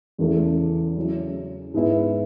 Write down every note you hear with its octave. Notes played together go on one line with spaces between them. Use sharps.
E2 C#3 E3 A3
C#3 F#3 C#4 E4
G#2 G#3 B3 E4 B4